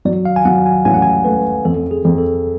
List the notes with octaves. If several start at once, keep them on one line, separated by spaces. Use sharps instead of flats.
F#3 D5
F5
G#5
F#3 F#5
G#5
A1 G#5
F#5
G#5
A3 B4
F2 A4
G#4
F2
A4